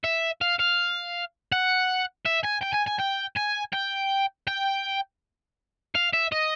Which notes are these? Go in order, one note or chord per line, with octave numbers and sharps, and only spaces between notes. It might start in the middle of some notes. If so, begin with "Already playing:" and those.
E5
F5
F5
F#5
E5
G#5
G5
G#5
G#5
G5
G#5
G5
G5
F5
E5
D#5